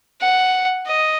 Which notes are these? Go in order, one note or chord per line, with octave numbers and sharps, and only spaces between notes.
F#5
D#5